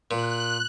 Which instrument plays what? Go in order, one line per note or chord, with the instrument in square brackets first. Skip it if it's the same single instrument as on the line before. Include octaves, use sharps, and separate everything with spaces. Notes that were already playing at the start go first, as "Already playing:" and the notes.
[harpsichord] A#2 [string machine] F#6